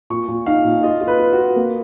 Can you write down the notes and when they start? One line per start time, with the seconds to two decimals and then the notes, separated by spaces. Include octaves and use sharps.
0.10 A#2 C#6
0.28 A#2
0.46 D#4 F5
0.65 A#2
0.83 F4 D#5
1.01 F4
1.08 B4
1.19 F4
1.32 F#4
1.38 F4
1.56 A#3